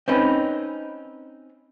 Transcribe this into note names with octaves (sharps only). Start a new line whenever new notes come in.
C4 C#4 D#4 B4